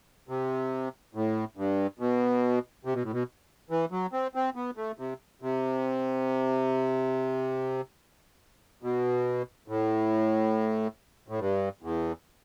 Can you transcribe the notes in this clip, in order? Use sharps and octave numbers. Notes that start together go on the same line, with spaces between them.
C3
A2
G2
B2
C3
B2
A2
B2
E3
F#3
C4
C4
B3
A3
C3
C3
B2
A2
A2
G2
E2